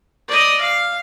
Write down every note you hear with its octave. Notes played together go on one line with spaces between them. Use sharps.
D5 D#5
F5